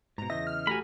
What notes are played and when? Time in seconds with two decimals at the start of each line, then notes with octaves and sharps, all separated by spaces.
0.18 G#2 B2 A#5
0.30 E2 C#3 D#5 E5 G6 A#6
0.47 F6
0.67 A3 F#4 G4 A4 G#5 A#5 B5